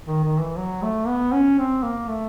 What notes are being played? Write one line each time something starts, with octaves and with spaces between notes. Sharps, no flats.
D#3
D#3
E3
F#3
A3
B3
C#4
C4
A#3
A3